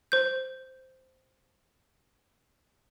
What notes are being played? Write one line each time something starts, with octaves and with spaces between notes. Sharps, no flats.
C5 G6